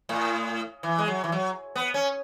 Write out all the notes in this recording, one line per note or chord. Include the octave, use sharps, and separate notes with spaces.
A2
E3
G#3
F#3
E3
F#3
B3
C#4